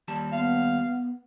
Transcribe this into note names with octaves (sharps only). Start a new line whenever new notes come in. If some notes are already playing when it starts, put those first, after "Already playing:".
D#2 G3 A5
B3 F5